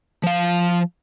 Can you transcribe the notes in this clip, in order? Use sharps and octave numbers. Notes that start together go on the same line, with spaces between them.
F3 F5